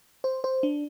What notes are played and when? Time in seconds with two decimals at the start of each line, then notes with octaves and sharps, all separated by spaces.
0.24 C5
0.44 C5
0.63 D4